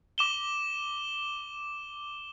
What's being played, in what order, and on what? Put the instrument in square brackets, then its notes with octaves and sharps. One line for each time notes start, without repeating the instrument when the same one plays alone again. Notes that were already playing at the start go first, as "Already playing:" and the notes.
[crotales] D6 E7 G7